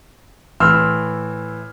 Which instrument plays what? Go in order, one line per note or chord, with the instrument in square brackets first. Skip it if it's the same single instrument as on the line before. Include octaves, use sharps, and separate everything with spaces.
[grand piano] A2 E3 C6 E6 F6